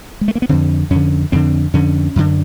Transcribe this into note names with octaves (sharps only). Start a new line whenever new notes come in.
G#3
A3
A#3
B3
F2 D3 C4
F2 D3 C#4
F2 D3 C4
F2 D3 C#4
F#2 D3